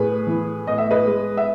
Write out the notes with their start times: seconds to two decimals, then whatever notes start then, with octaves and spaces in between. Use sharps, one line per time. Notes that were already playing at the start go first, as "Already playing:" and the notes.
Already playing: A2 G#4 B4
0.27 E3
0.67 A2 D#5
0.78 E5
0.91 B4 D#5
1.07 G#3
1.37 E5